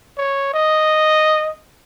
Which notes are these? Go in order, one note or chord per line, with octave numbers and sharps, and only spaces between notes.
C#5
D#5